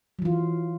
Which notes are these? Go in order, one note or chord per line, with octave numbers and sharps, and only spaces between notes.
E3 F#3 F4